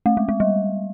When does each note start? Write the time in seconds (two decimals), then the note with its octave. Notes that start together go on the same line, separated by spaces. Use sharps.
0.06 A3
0.17 G#3
0.29 G#3
0.40 G3